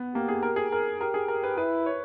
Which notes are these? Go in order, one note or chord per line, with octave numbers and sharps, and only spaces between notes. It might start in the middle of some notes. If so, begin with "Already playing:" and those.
Already playing: B3
A#3 G4
G#4
A#4
G#4
G#4 A#4
G4 A#4
G#4
A#4
B4
E4 B4
C#5